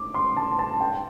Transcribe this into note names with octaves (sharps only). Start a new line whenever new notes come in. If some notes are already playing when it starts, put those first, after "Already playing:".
Already playing: D6
C6
A5
A5
G5